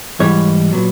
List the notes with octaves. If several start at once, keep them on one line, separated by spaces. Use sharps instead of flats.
G#2 E3 G3 C#5
A#2 F#3 B3